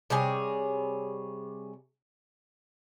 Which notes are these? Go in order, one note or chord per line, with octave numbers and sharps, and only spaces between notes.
C3 G3 G#4 C#5